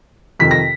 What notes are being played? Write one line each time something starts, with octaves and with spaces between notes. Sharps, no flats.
F2 C3 D#3 B6
A#6